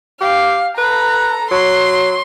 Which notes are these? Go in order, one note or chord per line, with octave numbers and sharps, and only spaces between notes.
G4 F5
A4 B4 A#5
F#3 C6